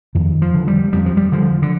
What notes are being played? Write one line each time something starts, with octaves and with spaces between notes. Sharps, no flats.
F2 D#3
F3
D3
G3
F2 G3
F3
G3
D3 F3
D3